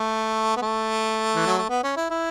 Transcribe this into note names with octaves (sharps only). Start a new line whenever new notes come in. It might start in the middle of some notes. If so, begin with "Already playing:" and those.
Already playing: A3
B3
A3
E3
F#3
A3
B3
C#4
E4
E4